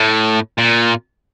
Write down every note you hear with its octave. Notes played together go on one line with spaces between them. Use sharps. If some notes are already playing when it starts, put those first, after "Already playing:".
Already playing: A2
A#2